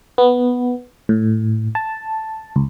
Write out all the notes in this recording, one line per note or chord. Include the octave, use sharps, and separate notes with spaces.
B3
A2
A5
C#2